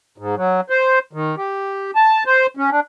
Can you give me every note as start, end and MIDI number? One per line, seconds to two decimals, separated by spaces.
0.18 0.35 44
0.37 0.61 54
0.70 0.99 72
1.13 1.35 51
1.37 1.91 67
1.96 2.24 81
2.26 2.47 72
2.57 2.70 61
2.71 2.80 62